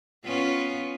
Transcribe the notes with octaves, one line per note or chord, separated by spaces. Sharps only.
B3 C#4 F4